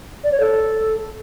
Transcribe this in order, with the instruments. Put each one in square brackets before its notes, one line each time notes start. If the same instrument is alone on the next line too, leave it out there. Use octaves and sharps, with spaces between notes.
[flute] D5
C#5
A4